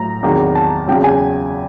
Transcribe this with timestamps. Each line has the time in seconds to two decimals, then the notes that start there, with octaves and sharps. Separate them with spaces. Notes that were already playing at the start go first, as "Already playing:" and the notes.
Already playing: A2 F#3 A#5
0.23 E2 C3 D#3 F#3
0.55 A5
0.88 E2 C#3 F#3 G5
1.04 G#5